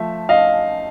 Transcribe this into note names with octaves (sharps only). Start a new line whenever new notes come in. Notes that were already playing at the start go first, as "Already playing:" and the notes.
Already playing: F3 A3 E5
D#5 F5